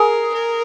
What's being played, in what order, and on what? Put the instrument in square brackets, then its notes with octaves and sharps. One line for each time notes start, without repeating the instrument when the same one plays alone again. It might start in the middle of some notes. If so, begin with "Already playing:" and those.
Already playing: [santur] G#4 [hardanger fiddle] A#4
[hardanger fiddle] A#4